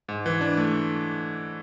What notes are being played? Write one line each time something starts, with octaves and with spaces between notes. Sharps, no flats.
G#2
E3
D4
A3